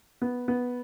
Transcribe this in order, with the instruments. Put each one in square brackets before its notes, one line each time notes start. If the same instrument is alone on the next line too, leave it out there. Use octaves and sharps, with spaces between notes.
[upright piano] B3
B3